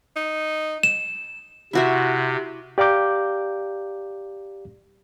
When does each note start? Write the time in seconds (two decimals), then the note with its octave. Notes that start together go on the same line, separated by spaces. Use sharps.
0.16 D#4
0.83 E7
1.73 C3 E4 F#4 E5
2.78 G4 D5 F5 A#5 D6 G6